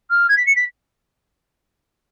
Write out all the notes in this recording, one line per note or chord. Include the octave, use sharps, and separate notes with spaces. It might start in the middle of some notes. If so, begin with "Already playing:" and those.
F6
G#6
B6
C#7
B6